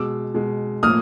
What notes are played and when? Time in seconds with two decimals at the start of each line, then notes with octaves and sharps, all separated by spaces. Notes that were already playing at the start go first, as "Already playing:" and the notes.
Already playing: B2 G#3 D6 E6
0.34 B2 G#3
0.83 A2 F3 A#3 D#6 F6